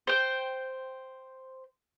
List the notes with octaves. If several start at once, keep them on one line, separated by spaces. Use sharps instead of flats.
C5 G5